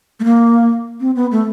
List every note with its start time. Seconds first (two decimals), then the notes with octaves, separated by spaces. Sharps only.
0.20 A3
0.24 A#3
1.00 C4
1.16 B3
1.32 A3